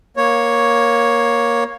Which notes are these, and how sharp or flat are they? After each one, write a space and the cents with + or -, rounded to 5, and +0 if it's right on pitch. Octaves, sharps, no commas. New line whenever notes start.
A#3 +15 C#5 +0